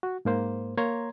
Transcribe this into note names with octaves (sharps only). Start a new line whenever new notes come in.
F#4
G#2 A#3 C5
A#3 C#5 A#5 C6 G#6